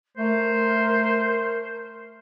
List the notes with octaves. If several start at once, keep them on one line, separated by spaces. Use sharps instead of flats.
A3 A#4 C5